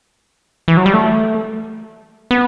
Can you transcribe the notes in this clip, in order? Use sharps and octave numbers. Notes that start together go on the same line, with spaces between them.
E3
F#3
G3
A3
B3